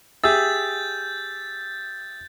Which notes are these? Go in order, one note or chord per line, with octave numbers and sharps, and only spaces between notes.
G4 G#4 E5 G6 A6